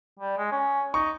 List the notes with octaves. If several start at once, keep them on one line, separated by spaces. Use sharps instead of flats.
G3
G#3
C#4
D#4 C#6